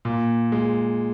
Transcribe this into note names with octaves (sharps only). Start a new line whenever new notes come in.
A#2
G#3